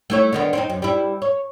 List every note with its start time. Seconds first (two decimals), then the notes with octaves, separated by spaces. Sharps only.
0.10 A3 E4 C#5
0.33 D3 D#3 B3
0.53 C4 C#4 D#4
0.70 F#2
0.82 G3 E4
1.22 C#5